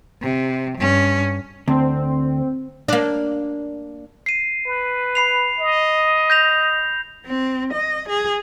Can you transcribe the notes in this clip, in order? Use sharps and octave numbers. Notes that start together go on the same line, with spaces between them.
C3
G2 C#4
D2 C4
A#3 D4
C7 D#7
B4
B5 C7 F7
D#5
G6 A#6 F7
C4
D#5
G#4